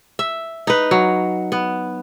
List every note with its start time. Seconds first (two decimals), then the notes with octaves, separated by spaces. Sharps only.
0.19 E5
0.67 D#4 B4
0.91 F#3
1.52 B3